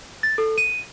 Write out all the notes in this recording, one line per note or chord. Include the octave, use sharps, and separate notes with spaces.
A6
A4
D#7